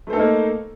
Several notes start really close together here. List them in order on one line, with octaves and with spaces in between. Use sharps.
A3 C5 A4 D#4 A#3